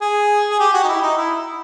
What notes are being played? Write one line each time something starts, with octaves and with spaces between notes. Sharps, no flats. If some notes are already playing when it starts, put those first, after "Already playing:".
G#4
G#4
G4
F#4
D#4
E4
D#4
E4